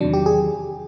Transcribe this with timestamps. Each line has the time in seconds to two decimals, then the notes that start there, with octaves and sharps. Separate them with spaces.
0.01 E2 C3 D#3 F#3 D4
0.13 G4
0.26 G#4